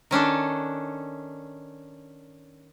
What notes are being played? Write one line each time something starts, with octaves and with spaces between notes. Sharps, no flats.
D#3 C#4 D4 A4